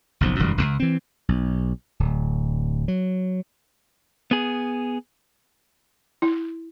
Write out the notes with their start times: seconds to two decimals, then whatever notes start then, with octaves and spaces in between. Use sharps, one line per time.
0.21 F#1 B1 F3
0.39 E1 F#2 D#3 G3
0.57 E1 C#2
0.80 E3 C4
1.29 B1
2.00 D1
2.88 F#3
4.31 B3 G#4
6.22 E4